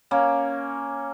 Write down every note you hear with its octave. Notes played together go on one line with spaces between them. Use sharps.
A#3 C#4